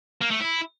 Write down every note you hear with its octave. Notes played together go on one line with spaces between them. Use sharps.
A#3
A3
E4